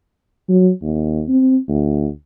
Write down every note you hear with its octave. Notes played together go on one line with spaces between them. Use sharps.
F#3
D#2
C4
D2